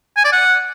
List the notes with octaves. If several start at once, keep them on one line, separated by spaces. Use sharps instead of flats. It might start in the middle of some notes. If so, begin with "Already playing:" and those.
G#5
D5
F#5